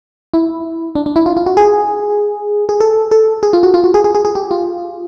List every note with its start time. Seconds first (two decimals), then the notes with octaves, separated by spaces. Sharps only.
0.34 E4
0.95 D4
1.06 D4
1.16 E4
1.26 F4
1.37 F4
1.46 F#4
1.57 G#4
2.69 G#4
2.80 A4
3.11 A4
3.43 G#4
3.53 F4
3.63 F#4
3.74 F4
3.84 F#4
3.94 G#4
4.04 G#4
4.15 G#4
4.25 G#4
4.35 G4
4.51 F4